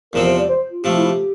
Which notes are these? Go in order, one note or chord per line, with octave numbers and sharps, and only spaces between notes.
E2 C3 F3 C4 A#4
C5
D5
C5
F4
C3 F3 A3 G4
E4
G4